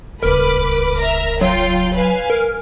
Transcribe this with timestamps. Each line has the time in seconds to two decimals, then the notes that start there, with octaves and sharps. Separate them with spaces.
0.23 D#1 C#2 A#4 B4 B5 D6
0.99 E5 A#5
1.41 F#3 F4 G5 C6
1.94 B4 F5 G#5
2.30 A#4